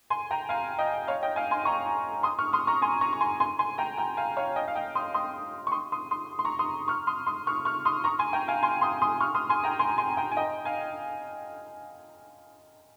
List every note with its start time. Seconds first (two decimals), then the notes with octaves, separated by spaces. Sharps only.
0.10 G#5 C6
0.31 G5 A#5
0.49 F5 G#5
0.79 D#5 G5
1.07 C#5 F5
1.22 D#5 G5
1.36 F5 G#5
1.51 G#5 C6
1.65 A#5 C#6
2.23 C6 D#6
2.39 C#6 F6
2.53 C6 D#6
2.67 A#5 C#6
2.82 G#5 C6
3.01 A#5 C#6
3.13 C#6
3.21 G#5 C6
3.40 G#5 C6
3.59 G#5 C6
3.78 G5 A#5
3.97 G5 A#5
4.17 F5 G#5
4.37 C#5 F5
4.56 D#5 G5
4.68 F5
4.75 D#5 G5
4.95 C6 D#6
5.14 C6 D#6
5.67 C#6
5.72 C6 D#6
5.92 C6 D#6
6.11 C6 D#6
6.39 C6
6.45 A#5 C#6
6.59 C6 D#6
6.88 C#6 F6
7.07 C6 D#6
7.27 C6 D#6
7.47 C#6 F6
7.65 C#6 F6
7.85 C6 D#6
8.04 A#5 C#6
8.19 G#5 C6
8.33 G5 A#5
8.48 F5 G#5
8.63 G#5 C6
8.81 C6 D#6
9.02 C6 D#6
9.20 C#6 F6
9.35 C6 D#6
9.49 G#5 C6
9.64 G5 A#5
9.79 G#5 C6
9.98 G#5 C6
10.17 G5 A#5
10.32 G#5
10.37 D#5 G5
10.65 F5 G#5